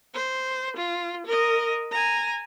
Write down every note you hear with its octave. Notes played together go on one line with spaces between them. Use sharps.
C5
F4
A#4 D#5
G#5 A#5